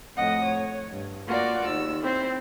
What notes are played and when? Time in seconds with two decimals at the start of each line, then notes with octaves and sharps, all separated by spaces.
0.16 F2 A2 D#5 F#5 D#6
0.44 C#5
0.89 G2
1.26 A#3 F4 F#4 D5
1.64 D#2 E6
2.03 C4 E4 C5